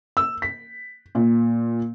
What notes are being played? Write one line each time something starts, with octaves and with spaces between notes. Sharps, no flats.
E6
B6
A#2